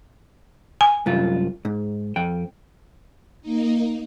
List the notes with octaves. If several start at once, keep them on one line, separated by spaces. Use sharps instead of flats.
G#5
C2 F#2 F4
G#2
F2 G5
A#3 D#4